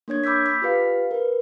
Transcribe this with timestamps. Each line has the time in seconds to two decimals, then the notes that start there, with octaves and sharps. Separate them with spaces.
0.08 A#3 D4 C#5 G#6
0.24 B5 D6 E6 G6 B6
0.46 B5 B6
0.62 F4 G4 B4 F5
1.11 A#4 B4